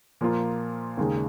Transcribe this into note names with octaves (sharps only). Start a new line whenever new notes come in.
A#2 F3 A#3 F4
D#2 C#3 G#3 D#4